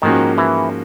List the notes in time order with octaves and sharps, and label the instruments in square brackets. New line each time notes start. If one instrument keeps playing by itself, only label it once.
[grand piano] G#2 F3 A#3 C#4 F#4 [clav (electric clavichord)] D#3
[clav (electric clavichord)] E3